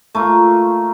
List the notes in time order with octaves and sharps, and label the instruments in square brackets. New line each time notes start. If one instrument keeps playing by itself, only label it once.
[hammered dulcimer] A3 A#3 F4